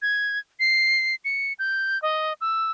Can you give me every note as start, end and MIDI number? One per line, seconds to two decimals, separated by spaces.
0.02 0.39 92
0.59 1.15 96
1.25 1.53 97
1.59 2.00 91
2.02 2.33 75
2.41 2.71 88